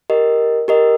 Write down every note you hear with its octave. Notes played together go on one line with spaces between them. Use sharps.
G4 A#4 D#5
G4 A#4 D#5